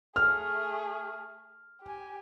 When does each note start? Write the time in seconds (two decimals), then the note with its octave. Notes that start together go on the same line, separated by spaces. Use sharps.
0.16 A3 G#4 F6
1.82 G4 G#5